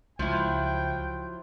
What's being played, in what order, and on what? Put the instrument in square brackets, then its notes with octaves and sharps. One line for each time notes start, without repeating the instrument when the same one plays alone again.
[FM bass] C#2 [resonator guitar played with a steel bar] F3 F#3 E4 [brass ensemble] G5